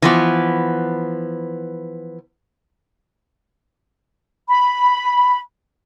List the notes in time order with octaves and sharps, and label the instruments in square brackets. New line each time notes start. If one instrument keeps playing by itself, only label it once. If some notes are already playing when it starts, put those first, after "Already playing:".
[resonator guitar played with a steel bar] E3 F3 B3
[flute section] B5